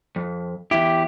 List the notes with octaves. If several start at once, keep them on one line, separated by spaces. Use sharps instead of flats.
F2
E2 E4 G4